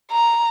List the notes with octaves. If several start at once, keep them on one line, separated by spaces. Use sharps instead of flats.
A#5